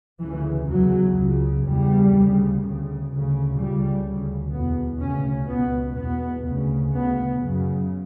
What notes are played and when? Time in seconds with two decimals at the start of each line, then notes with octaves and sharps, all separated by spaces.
0.20 D2 C#3 E3
0.68 E2 C#3 F#3
1.16 C#2 C#3
1.64 E2 C#3 G3
2.13 D2 C#3
2.60 D2 C#3
3.09 D2 C#3
3.56 C#2 C#3 G3
4.05 D2 C#3
4.52 E2 B2 B3
5.00 D2 C#3 C#4
5.48 C#2 B2 B3
5.96 E2 B2 B3
6.44 D2 C#3
6.92 D2 C#3 B3
7.40 F#2 C#3